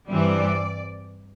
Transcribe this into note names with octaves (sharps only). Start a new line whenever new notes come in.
G2 E3 G3 C4 D5